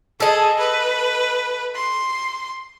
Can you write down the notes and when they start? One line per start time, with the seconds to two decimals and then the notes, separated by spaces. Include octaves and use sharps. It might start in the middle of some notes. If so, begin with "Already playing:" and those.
0.20 G#4 A4 D#5
0.58 B4
1.75 C6